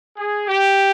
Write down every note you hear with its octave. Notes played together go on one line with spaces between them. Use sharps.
G#4
G4